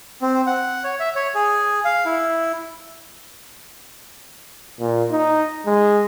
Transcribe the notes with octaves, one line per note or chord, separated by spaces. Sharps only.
C4
F#5
C#5
E5
C#5
G#4
F5
E4
A#2
D#4
G#3